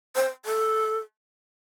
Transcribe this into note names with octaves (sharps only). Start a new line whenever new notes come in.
C5
A4